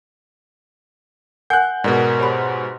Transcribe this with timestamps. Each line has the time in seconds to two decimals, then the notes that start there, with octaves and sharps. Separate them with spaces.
1.50 A#4 F#5 G#5 F#6 G6
1.84 G#2 B2 A#4 D5 G#6
2.20 G4 C5 C#5 B5 C6